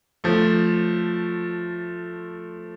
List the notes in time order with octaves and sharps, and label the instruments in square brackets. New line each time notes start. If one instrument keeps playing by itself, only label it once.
[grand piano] F3 A3